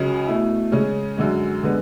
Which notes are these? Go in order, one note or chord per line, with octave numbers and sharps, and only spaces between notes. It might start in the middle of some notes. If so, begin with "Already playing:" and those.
Already playing: C#2 C#3 F#3 C#4
B2 A3 E4
C#3 G#3 C#4
F#2 D3 G#3
D3 G#3 B3